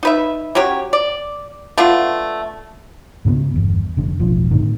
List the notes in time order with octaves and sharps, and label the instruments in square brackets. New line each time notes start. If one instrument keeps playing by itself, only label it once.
[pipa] D#4 B4 E5
F#3 C#4 G4 C#5
D5
A3 B3 D4 F4
[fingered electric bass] G#2 C#3 A#3 B3
G1 E2
F1 D3
E1 A1 F3
A2 D3 D#3